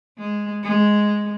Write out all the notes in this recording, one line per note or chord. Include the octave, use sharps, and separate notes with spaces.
G#3
G#3